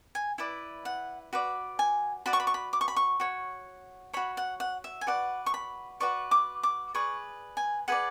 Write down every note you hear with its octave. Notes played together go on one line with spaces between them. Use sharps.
G#5
E4 B4 D5
F#5
F#4 B4 D5
G#5
F#4 B4 D5 B5
C#6
B5
C#6
B5
D6
C#6
B5
C#6
F#4 C#5
F#4 C#5 B5
F#5
F#5
E5
G#5
F#4 B4 D5 F#5
C#6
B5
F#4 B4 D5 C#6
D6
D6
G#4 B4 D5 C#6
G#5
G#4 B4 D5 F#5